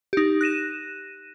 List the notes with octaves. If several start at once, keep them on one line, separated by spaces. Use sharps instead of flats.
D#4 G4
F#6 A#6 D#7 E7